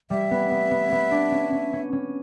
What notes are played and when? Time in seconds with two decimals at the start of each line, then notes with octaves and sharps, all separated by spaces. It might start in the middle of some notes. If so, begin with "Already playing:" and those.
0.10 G3 E5
0.31 B3
0.51 B3
0.71 B3
0.92 B3
1.11 D4
1.31 C#4
1.52 C#4
1.73 C#4
1.93 C#4